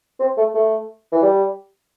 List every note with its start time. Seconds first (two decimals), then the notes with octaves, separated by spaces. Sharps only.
0.20 C4
0.37 A3
0.55 A3
1.12 E3
1.22 G3